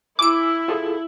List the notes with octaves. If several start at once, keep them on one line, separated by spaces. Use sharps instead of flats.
E4 G#5 D6 E6 D7
F4 G#4 A4